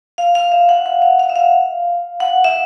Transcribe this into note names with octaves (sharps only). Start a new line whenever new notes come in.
F5
F5
E5
F#5
F#5
F5
F5
E5
F5
F#5
E5